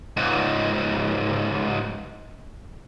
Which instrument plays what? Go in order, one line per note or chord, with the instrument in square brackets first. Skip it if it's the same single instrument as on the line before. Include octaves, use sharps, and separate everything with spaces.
[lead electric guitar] C#2 G#2